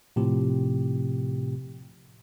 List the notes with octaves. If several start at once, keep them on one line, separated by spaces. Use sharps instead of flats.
A2 C3 F3 G4